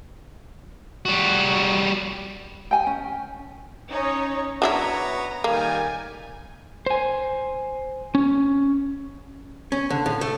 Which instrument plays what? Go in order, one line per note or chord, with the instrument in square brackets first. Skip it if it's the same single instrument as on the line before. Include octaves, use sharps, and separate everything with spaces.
[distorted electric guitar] G3 F#4
[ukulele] G5 G#5
C#4
[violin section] C#4 D#4 C#5
[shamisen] F#3 D4 E4 [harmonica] B3 C#5 [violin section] A#5
[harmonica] D#3 G3 [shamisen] A#3 [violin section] G#5
[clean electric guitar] C5 G#5
C#4
[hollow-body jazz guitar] C#4
D3
A2
A3